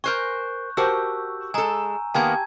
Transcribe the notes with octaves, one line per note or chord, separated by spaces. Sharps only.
A#4 C5 G#5 C#6 F#6 G6
F#4 G4 A#4 C5 A5 E6
G#3 A4 G#5 A#5
D#3 A#3 B3 G4 G#5 A5 G#6